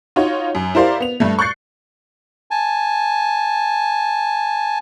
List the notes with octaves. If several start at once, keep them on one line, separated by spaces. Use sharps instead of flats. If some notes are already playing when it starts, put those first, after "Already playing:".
D#4 F4 F#4 C#5
F#2
E4 G4 A#4 C5 D5 F5
B3 F7
G2 A3
C#6 F#6 G6 A6 C7 C#7
G#5 A5